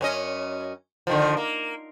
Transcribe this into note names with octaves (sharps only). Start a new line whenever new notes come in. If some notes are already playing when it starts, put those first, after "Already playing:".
F#2 C#4 D#5
D3 D#3 F3
A#3